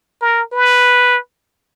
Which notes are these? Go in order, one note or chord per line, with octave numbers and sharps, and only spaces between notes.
A#4
B4